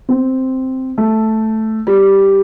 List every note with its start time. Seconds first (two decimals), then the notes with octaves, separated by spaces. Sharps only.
0.09 C4
0.98 A3
1.87 G3